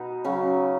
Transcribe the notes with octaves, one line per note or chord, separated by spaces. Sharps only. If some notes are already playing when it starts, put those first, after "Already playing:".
Already playing: B2 B3 D#4
C#3 F#3 C#4